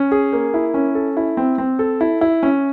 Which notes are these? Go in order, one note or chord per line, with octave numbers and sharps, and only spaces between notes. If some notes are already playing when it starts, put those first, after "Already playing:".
Already playing: C#4
G#4
A#3
E4
C#4
A4
E4
C4
C4
A4
E4
E4
C#4